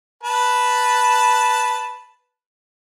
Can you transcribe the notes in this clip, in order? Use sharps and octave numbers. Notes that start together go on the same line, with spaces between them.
B4 A5